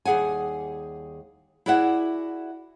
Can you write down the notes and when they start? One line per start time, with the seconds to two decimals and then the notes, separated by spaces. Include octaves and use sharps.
0.05 D#2 G3 G#4 F#5 G#5
1.66 E4 F#4 G#4 D5 E5 F#5